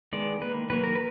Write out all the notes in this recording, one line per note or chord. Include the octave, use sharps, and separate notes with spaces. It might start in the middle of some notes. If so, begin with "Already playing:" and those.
D#3 G#3 B3 D5
D#3 A#3 B4
D#3 F#3 A#3 B4
A#4
B4